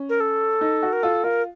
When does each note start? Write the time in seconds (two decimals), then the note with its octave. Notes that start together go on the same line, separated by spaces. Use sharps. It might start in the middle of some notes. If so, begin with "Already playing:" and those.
Already playing: C#4
0.09 A#4
0.20 A4
0.61 D#4
0.83 F#4
0.93 A#4
1.03 F4 A4
1.24 F4 A#4